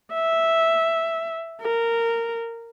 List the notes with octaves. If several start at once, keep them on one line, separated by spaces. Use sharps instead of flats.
E5
A#4